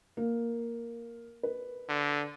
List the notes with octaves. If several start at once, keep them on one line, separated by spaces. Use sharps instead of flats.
A#3
B4
D3